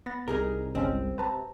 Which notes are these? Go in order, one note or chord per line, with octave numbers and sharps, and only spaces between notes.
B3 A6 A#6
C2 D#4 G#4 A#4
G1 G#3 C4 C#4
C3 B4 A5 A#5